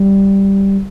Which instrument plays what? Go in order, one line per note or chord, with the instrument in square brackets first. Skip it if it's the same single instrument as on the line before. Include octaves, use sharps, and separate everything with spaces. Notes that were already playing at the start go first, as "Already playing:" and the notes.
Already playing: [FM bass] G3